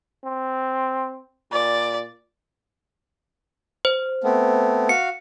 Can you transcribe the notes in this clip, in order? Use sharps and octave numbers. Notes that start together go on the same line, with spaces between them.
C4
A#2 D5
C5
A3 B3 C4
F#4 F5 C#7